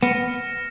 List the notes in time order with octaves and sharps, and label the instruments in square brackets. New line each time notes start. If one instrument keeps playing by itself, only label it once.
[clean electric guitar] B3 [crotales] F6 A#6 C#7 E7